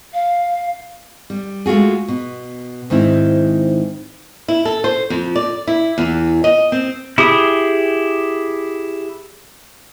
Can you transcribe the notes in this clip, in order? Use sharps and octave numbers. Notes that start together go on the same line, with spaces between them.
F5
G3
G#3 A3 F4 F#4 G#4
B2
G#2 D#3 C4 E4
E4
A4
C5
F2
D5
E4
E2
D#5
C4
E4 G4 G#4 D#6